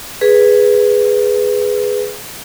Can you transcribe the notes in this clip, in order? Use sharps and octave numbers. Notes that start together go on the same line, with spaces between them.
G#4 B4